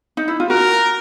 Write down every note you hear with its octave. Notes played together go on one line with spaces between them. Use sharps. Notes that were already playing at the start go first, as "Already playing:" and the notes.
D#4
E4
F4
F#4 A#4